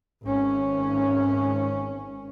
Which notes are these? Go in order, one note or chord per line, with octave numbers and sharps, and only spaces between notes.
G#1 C#4